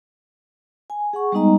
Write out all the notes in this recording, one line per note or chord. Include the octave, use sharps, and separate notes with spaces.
G#5
G#4 F#5 C#6
G3 G#3 B3 D#4 D#5 A#5